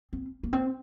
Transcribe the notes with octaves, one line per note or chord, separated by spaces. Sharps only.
C4
A#3
C4